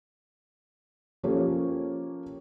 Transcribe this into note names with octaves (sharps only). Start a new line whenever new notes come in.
F3 A#3 C#4 G4 A4 C#5